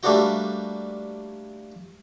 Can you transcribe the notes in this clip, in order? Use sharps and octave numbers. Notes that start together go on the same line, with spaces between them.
G3 A3 A#3 D4 F#4 G5